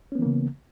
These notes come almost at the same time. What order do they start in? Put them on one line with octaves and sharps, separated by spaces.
C#4 B3 E3 A#3 C#3